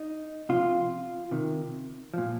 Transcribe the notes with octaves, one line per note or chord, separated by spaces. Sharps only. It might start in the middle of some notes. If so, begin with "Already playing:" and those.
Already playing: D#4
C3 F3 F4
C3 D#3
A#2 F3